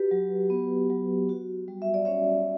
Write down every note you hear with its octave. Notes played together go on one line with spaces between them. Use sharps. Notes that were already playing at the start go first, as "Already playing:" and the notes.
Already playing: F#4 G4 B4
F#3
B3
F#3
F#4
G3
E5
D5
C#4 C#5 E5